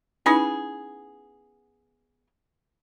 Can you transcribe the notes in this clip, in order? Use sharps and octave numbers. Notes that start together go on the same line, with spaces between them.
B3 C#4 D#4 E4 G#4